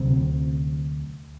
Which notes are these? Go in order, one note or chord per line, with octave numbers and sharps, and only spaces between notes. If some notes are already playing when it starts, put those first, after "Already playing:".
Already playing: D2 C3 F#3 C4